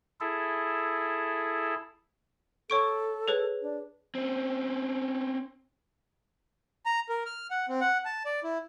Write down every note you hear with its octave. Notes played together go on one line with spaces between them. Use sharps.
E4 G#4 A4
A4 C#5 C#6 D7
G#4 B4 C#5
D4
C4 C#4
A#5
A#4
F6
F#5
C4
F#5
A5
D5
E4